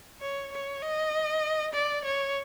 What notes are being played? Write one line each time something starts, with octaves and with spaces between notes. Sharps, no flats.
C#5
C#5
D#5
D5
C#5